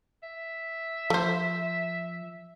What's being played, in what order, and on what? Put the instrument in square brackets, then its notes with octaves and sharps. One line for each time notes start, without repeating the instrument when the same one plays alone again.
[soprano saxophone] E5
[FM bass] F3 [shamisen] A3 C5